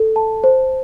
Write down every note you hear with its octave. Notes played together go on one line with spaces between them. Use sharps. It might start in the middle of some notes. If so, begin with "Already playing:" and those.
Already playing: A4
A5
C5